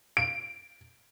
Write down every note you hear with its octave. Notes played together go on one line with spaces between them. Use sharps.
D7